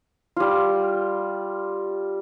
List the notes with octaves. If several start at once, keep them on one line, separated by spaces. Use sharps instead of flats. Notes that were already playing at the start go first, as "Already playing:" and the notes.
G3 F4